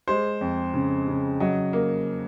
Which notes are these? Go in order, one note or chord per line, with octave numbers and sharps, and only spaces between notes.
G#3 C5
F2
C#3
C#3
F#3 D#5
A#3